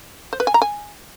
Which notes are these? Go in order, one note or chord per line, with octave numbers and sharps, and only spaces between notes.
C5
B4
G#5
A#5
G#5